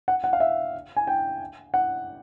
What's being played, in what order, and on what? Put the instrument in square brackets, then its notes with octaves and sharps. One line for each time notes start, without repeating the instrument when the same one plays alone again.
[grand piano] F#5
F#5
F5
E5
G#5
G5
F#5